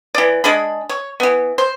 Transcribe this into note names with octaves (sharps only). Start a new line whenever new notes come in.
E3 D5
G#3 D4 G#4 B5
C#5
E3 B3
C5